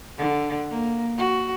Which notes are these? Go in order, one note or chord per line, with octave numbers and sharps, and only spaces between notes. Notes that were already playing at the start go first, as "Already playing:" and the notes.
D3
A#3
F#4